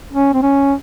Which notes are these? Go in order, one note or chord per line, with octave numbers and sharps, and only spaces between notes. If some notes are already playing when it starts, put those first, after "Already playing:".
C#4
C4
C#4